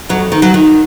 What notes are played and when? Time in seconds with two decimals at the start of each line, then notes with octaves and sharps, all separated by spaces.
0.09 F2 F#3
0.32 D#3
0.42 F#3
0.54 D#3